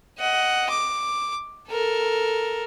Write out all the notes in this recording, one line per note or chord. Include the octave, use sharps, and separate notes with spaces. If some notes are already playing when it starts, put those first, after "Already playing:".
D#5 F#5
D6
A4 A#4